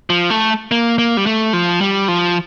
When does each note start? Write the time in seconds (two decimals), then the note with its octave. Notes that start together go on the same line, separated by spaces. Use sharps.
0.10 F3
0.30 A3
0.71 A#3
0.98 A#3
1.17 G3
1.26 A3
1.53 F3
1.81 G3
2.08 F3